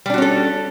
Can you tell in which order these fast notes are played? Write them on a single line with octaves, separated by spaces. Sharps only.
G3 D4 F#4 C#4 A4